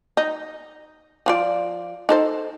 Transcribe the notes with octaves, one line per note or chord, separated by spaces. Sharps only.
D#4
F3 F4 D5
D#4 A4 C5